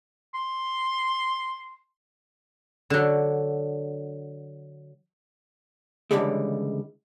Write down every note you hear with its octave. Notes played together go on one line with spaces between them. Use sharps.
C6
D3 F#3
C#2 D3 E3 G3 G#3